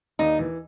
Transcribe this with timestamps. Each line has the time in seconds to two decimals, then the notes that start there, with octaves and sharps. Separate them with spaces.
0.19 D#2 D#4
0.39 E3